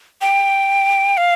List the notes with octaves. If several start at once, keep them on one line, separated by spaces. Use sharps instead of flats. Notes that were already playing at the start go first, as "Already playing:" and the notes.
G5
F5